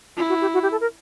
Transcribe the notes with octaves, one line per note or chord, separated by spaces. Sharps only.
E4 F4
F#4
G4
F#4
G4
A4
A#4